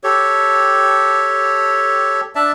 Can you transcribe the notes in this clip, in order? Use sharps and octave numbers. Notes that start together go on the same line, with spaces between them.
G4 A4 C#5
D4 D5 E5 A5